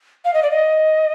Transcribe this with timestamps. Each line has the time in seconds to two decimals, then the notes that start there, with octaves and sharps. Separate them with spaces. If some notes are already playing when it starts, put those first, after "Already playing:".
0.25 F5
0.34 D#5
0.43 D5
0.51 D#5